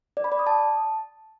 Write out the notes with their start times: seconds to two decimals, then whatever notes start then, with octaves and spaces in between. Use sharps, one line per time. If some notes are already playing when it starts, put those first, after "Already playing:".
0.17 D5
0.24 B5
0.32 D5
0.39 D#6
0.47 A5